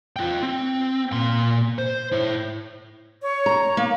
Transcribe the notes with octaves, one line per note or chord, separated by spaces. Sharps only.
F4 G5
C4
A#2 C6
C5
E4 C#5
C#5
A#5
A#3